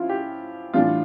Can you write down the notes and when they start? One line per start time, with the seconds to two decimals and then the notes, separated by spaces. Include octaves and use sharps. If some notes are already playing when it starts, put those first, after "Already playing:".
Already playing: F3 C#4 E4 F4
0.09 G4
0.73 A2 E3 G3 D4 F4